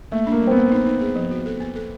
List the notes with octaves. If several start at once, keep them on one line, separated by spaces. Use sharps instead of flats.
A3 A#3
D4
A#3
G3
C4
A#3 B3
D#4
D#4
G#4
F3
F#4
A4
B3
A4